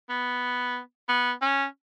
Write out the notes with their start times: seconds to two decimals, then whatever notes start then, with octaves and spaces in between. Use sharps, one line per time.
0.10 B3
1.09 B3
1.42 C#4